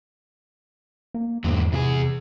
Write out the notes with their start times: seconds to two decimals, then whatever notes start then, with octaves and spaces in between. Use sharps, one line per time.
1.14 A#3
1.44 E2 G#2 D3 F#3
1.72 E2 C3 E4 G#4